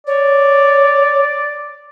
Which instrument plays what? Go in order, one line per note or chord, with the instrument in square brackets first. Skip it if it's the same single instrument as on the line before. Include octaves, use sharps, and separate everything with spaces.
[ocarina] C#5 [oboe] D5